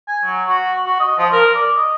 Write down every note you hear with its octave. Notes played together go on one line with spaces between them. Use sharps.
G#5
F#3
F#4
F#4
D#5
F3
A#4
D5
D#5